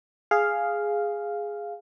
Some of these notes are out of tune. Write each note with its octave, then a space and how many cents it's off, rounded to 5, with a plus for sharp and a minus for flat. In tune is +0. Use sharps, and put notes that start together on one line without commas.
G#4 +0 F5 +0